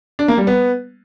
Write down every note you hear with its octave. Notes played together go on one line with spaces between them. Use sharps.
D4
A#3
G3
B3